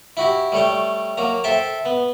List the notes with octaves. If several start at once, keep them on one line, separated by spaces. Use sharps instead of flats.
E4 F#4 G4
G3 A3 C#5 G5
F#3 A#3 A#5
A4 C5 E5 G5 A5
B3